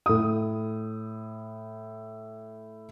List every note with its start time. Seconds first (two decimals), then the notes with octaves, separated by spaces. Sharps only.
0.06 A2 D#6